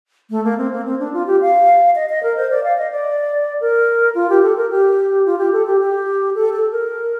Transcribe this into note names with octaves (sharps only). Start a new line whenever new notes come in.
A3
A#3
C4
A#3
C4
D4
F4
G4
F5
D#5
D#5
A#4
C5
D5
F5
D#5
D5
A#4
F4
G4
A4
A#4
G4
F4
G4
A4
G4
G4
A4
A4
A#4